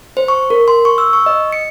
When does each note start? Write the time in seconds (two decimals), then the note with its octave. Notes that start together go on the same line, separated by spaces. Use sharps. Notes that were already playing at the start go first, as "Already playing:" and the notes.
0.17 C5
0.28 C#6
0.50 A#4
0.68 C6
0.85 C#6
0.98 E6
1.13 C#6
1.26 D#5
1.52 C#7